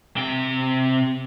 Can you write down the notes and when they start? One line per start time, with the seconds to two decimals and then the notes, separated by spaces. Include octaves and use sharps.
0.17 C3 G5